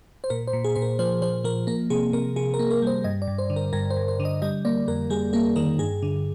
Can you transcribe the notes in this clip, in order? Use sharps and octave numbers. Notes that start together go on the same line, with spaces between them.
C5
A#2 A#4
C5
A#2
G#4
A#2 C5
A#4
F3 C5
F3 C5
F3 A#4
A#3 A#4
C3 G#4
C3 A#4
C3 G#4
A#4
A#3
A#4
G3 C5
G2 D#5
D5
G2
C5
D3
A#4
G2 A#4
C5
G2
C5
D3
D#5
G3 D#5
A#3 D5
F2 A#4
G3 G#4
A#3 G#4
D#3 A#4
G2 G#4
D3